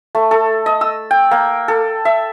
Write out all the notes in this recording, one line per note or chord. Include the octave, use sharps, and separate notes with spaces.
A3
A4
D#5
E6
G5
A#3
A4
E5